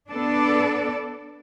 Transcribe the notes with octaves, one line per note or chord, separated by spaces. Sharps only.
B3 D4 A4 D5